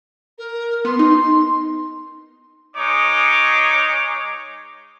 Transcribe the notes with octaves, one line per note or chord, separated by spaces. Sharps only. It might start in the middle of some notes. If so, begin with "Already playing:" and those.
A#4
B3 C6
D#4
G#3 D#4 C#5 D6